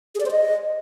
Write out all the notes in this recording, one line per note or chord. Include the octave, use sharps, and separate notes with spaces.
G#4
D5
C5
D#5